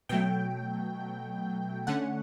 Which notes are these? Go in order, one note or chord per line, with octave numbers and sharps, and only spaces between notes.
B2 F#3 A3 G5
D3 A3 C#4 F#5